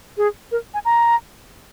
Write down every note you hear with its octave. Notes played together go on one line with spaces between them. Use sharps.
G#4
A#4
G#5
A#5